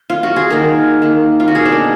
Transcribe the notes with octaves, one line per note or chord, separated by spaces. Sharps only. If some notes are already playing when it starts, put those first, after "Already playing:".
Already playing: D#4
F4
F#4
G#4
D#3 A#3 A#4
D#3 A#3
F4
F#4
B2 A#3 G#4
D4
D#4